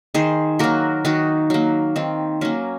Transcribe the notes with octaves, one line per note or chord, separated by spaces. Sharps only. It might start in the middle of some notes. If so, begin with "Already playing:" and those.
D#3 G#4 C5
F#3 A#3 F#4 A#4
D#3 D#4 F#4
F#3 A#3
D#3 C4
F#3 A#3 C#4